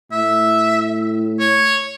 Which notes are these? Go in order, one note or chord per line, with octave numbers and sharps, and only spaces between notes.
A2 E5
C#5